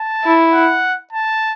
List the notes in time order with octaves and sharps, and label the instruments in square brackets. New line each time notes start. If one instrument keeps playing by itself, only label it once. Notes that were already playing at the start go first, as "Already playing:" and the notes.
Already playing: [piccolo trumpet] A5
[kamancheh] E4
[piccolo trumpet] F#5
A5